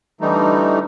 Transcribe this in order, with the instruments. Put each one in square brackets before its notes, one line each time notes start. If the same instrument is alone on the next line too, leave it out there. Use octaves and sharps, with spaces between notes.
[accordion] D3 E3 G3 A3 D#4